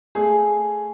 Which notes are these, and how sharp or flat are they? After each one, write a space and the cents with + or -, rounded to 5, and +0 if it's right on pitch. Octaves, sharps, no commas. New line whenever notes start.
A3 +0 G#4 +5